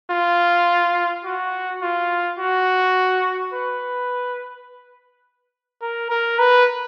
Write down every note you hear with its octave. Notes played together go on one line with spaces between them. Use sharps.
F4
F#4
F4
F#4
B4
A#4
A#4
B4